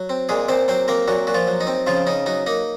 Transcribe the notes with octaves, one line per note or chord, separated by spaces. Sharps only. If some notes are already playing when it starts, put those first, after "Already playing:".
Already playing: F#3
C4
A#2 G#3 G#4
A#2 C4 C5
F#3 C4 C5
A#3 C4 A#4
A#2 F#3 F#4
A#2 F#4
F3 F4
F#3
D#4
C4
C#3 F3 F4
C#3 D#4
F#3 D#4
A#3 D#4